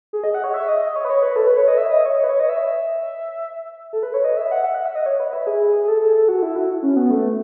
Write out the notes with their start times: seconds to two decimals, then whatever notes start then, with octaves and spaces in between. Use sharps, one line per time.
0.13 G#4
0.24 D#5
0.34 F#5
0.44 C#5
0.54 E5
0.68 D#5
0.81 D#5
0.96 C#5
1.05 B4
1.10 C#5
1.23 B4
1.36 A4
1.47 B4
1.57 C#5
1.68 D#5
1.77 E5
1.91 D#5
2.06 C#5
2.19 C#5
2.24 B4
2.29 C#5
2.40 D#5
2.49 E5
3.93 A4
4.03 B4
4.14 C#5
4.24 D#5
4.37 E5
4.52 F#5
4.64 E5
4.74 F#5
4.85 E5
4.95 D#5
5.06 C#5
5.20 B4
5.33 E5
5.47 G#4
5.67 G#4
5.83 G#4
5.88 A4
6.01 A4
6.15 A4
6.28 F#4
6.42 E4
6.56 F#4
6.83 C#4
6.96 B3
7.10 A3